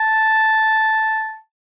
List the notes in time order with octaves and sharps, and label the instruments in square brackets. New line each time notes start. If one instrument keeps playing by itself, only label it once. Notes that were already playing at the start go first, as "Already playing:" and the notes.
Already playing: [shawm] A5